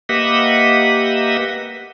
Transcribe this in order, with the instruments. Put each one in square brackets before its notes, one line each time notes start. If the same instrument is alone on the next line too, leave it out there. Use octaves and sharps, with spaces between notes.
[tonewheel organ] A#3 G4 B4 D#5 E5 F#5